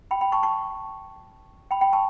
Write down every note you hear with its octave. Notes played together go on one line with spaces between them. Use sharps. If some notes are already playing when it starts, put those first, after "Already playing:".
G5 B5
G5 B5
A5 C#6
A5 C#6
G5 B5
G5 B5
A5 C#6